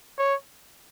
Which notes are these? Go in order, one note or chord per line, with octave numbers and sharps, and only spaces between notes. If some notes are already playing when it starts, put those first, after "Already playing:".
C#5